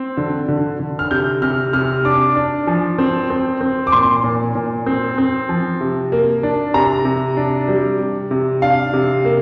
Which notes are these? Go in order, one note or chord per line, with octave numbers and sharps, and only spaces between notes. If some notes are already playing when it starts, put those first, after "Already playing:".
Already playing: C4
D3
D3
D3
F6
C3 G6
C3 F6
C3 F6
D4 D6
D4
F3
C4
C4
C4
D6
A#2 C6
A#2
A#2
C4
C4
F3
C3
A#3
D4
C3 A#5
C3
D4
G3
C3
C3
D4 F5
C3
A#3